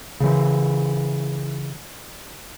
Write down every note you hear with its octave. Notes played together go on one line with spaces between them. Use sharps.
C#3 E3